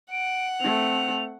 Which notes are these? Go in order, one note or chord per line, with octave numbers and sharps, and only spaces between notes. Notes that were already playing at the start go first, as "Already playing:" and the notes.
F#5 D7
A3 C4 F7